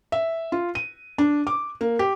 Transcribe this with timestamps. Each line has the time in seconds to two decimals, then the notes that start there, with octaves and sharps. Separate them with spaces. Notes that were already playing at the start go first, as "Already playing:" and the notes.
0.12 E5
0.52 F4
0.75 D#7
1.18 D4
1.47 D6
1.81 A#3
1.99 G4